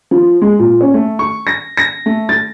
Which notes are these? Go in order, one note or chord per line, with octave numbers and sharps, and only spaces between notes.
F3
G#3
A#2
C#4
A3
C#6
A#6
A#6
A3
A6